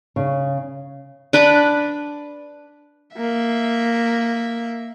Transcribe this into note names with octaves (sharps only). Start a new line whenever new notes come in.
C#3
D4 B4 B5 D6
A#3 E5